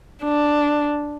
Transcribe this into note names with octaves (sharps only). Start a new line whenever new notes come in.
D4